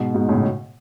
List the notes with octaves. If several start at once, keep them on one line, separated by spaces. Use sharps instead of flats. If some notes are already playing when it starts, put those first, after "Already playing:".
Already playing: G#2 B2
G#2 B2
A2 C#3